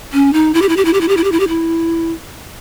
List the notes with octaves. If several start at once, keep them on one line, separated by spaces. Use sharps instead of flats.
C#4
D#4
E4
G4
E4
G4
E4
G4
E4
G4
E4
G4
E4
G4
E4